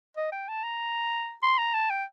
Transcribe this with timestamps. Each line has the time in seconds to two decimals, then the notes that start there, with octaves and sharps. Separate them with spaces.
0.17 D#5
0.32 G5
0.48 A5
0.64 A#5
1.43 C6
1.58 A#5
1.74 A5
1.90 G5